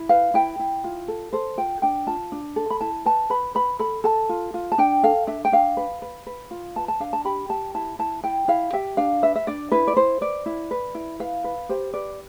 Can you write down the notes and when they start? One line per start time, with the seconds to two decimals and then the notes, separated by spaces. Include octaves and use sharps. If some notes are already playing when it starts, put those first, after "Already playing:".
Already playing: E4
0.09 B4 F5
0.34 E4 G5
0.59 E4
0.84 F4
1.08 A4
1.33 A4 C5
1.57 F4 G5
1.82 D4 G5
2.07 F4 A5
2.32 D4
2.56 A4
2.70 B5
2.81 E4 A5
3.05 B4 A5
3.30 B4 B5
3.55 B4 B5
3.79 A4 B5
4.04 A4 A5
4.29 F4
4.54 F4
4.72 A5
4.78 D4 G5
5.03 A4 F5
5.27 D4 E5
5.45 G5
5.52 D4 F5
5.77 B4
6.02 B4
6.27 B4
6.51 F4
6.76 B4 A5
6.88 A5
7.00 D4 F5
7.13 A5
7.25 G4 B5
7.49 G4 A5
7.75 E4 A5
7.99 E4 A5
8.24 E4 G5
8.48 E4 F5
8.73 G4 E5
8.97 D4 F5
9.22 B4 E5
9.36 E5
9.47 D4 D5
9.72 E4 B4
9.87 D5
9.97 E4 C5
10.21 B4 D5
10.46 E4
10.71 B4
10.95 E4
11.20 B4 F5
11.44 B4
11.69 G4 C5
11.94 B4 D5